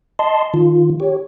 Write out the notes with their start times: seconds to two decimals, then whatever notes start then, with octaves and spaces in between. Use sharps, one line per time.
0.19 D#5 A5 C6
0.54 D#3 F4
1.00 G4 C#5